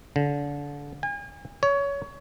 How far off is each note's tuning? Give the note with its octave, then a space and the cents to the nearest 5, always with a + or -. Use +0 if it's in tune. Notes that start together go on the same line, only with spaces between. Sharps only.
D3 -30
G#5 -40
C#5 +20